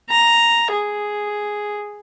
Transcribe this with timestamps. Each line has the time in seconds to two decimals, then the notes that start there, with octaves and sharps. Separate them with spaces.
0.10 A#5
0.72 G#4